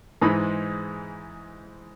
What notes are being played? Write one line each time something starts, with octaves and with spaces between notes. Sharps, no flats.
G#2 E3 G#3 D#4 D#5 B5